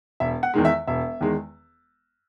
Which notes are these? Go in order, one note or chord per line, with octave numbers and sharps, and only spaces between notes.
E1 E5
F#5
E2 D#3 G#3
E5
E1 E5
E2 D#3 G#3